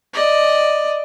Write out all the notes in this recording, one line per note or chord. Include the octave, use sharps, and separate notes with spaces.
D5 D#5